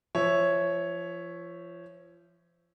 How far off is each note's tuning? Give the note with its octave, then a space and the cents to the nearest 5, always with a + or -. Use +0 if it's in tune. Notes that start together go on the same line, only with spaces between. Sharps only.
F3 -30 C#5 +0 E5 +0